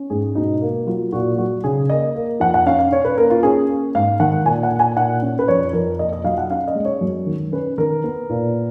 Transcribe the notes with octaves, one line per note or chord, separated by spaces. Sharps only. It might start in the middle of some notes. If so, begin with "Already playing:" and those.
Already playing: C#4
G#2 G#4
B2 D#4
A#3
F#3 F4
A#2 F#4
F#3 F#4
C#3 G#4
A#3 D#5
A#3
F2 F#5
F#5
C#4 F5
F5
C#4 C#5
B4
A#3 A#4
F4
C#4 G#4
A#3
G#2 F5
D#3 F#5
A#2 G#5
F#5
A#2
G#5
A#2 F#5
C#4
B4
F2 C#5
F2 A#4
A#3 D#5
D#5
F#3 F5
F#5
C#4 F5
D#5
G#3
C#5
F#2
D#3
C#4 B4
D#3 A#4
B3
A#2